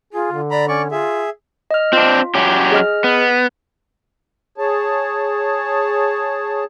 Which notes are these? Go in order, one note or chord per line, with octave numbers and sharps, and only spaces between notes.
F4 G#4
D3
D5 A#5 B5
C#4 D5 C#6
F4 G#4 E5
D#5 F6
C4 D4 F4
F#3 C#4 G4
G#4 D#5 F6
B3
G#4 C#5 A5